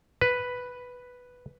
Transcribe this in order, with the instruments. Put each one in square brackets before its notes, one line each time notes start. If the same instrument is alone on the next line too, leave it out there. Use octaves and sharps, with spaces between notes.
[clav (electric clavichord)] B4